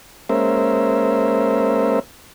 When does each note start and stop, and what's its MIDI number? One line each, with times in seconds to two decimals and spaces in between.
0.29 1.99 56
0.29 1.99 58
0.29 1.99 61
0.29 1.99 70
0.29 1.99 72
0.29 1.99 76